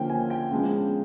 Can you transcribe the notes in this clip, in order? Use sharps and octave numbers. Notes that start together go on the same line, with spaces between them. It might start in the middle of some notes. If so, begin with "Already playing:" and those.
Already playing: D3 F3 A#3 C#4 G5
G#5
G5
C#3 F3 G#3 B3 D4